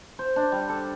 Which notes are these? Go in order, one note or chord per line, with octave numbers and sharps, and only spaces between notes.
C5
D4
G3
A4